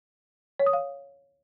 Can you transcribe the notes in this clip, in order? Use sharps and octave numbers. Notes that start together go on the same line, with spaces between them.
C#5
D#6
F5